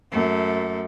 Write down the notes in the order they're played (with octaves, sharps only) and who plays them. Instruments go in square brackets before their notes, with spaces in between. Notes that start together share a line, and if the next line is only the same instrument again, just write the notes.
[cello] F#2 A3